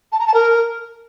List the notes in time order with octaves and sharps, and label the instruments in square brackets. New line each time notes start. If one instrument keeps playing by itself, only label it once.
[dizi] A5
A#5
A5
A#4